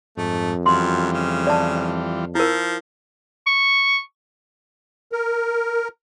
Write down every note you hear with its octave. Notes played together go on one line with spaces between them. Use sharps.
F2 G#2 A3
F#2 E3 G3 F4 C6
C#3
D5 A5
F3 E4 A#4
C#6
A#4